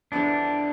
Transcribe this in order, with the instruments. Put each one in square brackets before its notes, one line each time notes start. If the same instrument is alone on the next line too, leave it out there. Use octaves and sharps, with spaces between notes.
[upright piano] E2 D3 F3 B3 E4 [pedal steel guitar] D4